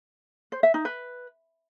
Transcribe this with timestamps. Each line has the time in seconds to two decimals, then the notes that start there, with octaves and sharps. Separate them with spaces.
0.52 C5
0.63 E5
0.74 D#4
0.85 B4